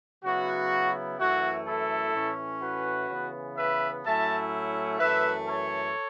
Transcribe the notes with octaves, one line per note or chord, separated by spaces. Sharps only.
C#3 F#3 B3 E4 F#4
F#2 E3 A3 E4 F#4
E4 A4
A2 E3 C#4
F#4 B4
C#3 E3 B3
B4 E5
A2 F#3 A3 C#4 E4 E5 A5
F#2 E3 A3 B4 E5
A4 C#5